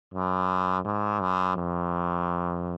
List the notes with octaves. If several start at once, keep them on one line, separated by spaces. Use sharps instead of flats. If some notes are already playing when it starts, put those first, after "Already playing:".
F#2
G#2
F#2
F2